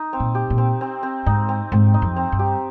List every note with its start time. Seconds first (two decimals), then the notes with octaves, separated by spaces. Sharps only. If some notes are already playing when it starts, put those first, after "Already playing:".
Already playing: D#4
0.13 C4
0.20 A#2
0.35 G4
0.50 A#2
0.58 C4
0.81 C4
1.03 C4
1.26 G#2 D#4
1.49 C4
1.72 G#2 C4
1.94 D#4
2.02 F2
2.16 C4
2.32 G2
2.39 G4